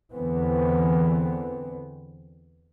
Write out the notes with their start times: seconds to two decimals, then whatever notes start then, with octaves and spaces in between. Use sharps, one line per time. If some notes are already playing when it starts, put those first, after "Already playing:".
0.12 E2 D3 E3 B3 C4